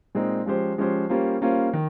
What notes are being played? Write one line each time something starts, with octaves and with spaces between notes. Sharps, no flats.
A#2 G#3 C4 D#4
F3 G#3 C#4 G4 C5
F3 G#3 C#4 G4 C5
G3 A#3 C#4 F4 C5
G3 A#3 C#4 F4 C5
D#3